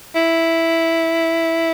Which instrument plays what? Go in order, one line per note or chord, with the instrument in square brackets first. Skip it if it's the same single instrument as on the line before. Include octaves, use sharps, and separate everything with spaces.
[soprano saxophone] E4